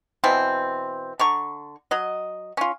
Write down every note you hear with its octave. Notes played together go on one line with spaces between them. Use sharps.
B2 E3 C4
D3 A#5 C#6
F#3 D#5
C#4 F4